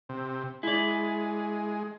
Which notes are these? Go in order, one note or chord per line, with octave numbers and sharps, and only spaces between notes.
C3
G#3 E4 D5